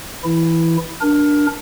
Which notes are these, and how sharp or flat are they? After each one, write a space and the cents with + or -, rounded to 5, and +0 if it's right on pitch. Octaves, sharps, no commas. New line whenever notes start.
E3 +0 E4 +0
D4 +0 A#4 +15